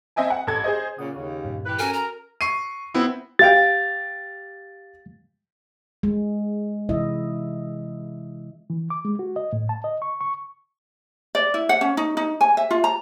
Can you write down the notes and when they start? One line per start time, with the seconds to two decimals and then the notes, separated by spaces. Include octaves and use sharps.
0.16 C4 D#5 E5 G#5 A5
0.30 F#5
0.47 A1 A4 A5 G#6
0.64 G#4 C5 D#5
0.98 A#2 C#3 F#5 D#6
1.15 D#2 C#3
1.44 G2 A#2
1.66 E3 G4 B4
1.79 C#4 F#4 A4 A#4 G#5
1.93 A#5
2.41 C#6 C7 D#7
2.94 B3 C4 E4
3.39 G4 F5 G5 A6
6.03 G#3
6.89 C3 E3 E4 D#5 E5
8.70 E3
8.90 D6
9.05 G#3
9.19 F#4
9.36 D#5
9.53 A2
9.69 A5
9.84 D#5
10.02 C#6
10.21 C#6
11.35 D5
11.54 E4
11.69 F#5
11.81 C#4
11.97 D#4
12.17 D#4
12.41 G#5
12.57 E5
12.71 F4
12.84 A#5